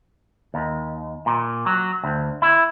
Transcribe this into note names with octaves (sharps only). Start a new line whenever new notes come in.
D#2
A#2
F#3
D2
E4